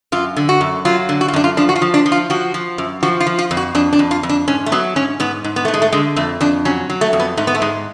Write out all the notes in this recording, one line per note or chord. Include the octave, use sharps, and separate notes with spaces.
F#2 F4
D3
F#4
F#2
F#3 F4
D3
F#4
F4
F#2 D4
F4
F3 D4
F#4
F4
F3
D4
F3
F4
F3 F#4
F3
F#2
F3 F#4
F4
F3
F4
F2
F#4
F2 D4
D4
F2
F4
F2
D4
G#2 C#4
A3
F#3 B3
G#2 C#4
G#2 B3
G#2
B3
G#2 A3
G#3
A3
D3 G#3
F2 A3
F2 D4
F#3 C#4
F#3
A3
F2
B3
G#2 A3
B3
A3
G#2 G#3